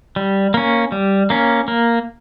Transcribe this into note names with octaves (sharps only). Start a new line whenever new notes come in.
G3
A#3 C#4
G3
A#3 C#4
A#3